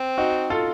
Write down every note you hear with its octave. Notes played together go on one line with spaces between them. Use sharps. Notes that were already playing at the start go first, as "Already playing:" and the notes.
Already playing: C4
D#4 F#4
F4 A4